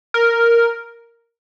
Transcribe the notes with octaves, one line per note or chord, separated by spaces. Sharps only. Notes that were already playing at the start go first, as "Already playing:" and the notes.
A#4